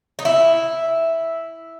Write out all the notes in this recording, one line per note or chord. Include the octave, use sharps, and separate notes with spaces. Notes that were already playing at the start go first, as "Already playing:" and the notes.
D#4
E4